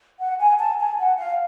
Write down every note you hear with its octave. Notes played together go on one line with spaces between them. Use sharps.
F#5
G#5
A5
G#5
F#5
F5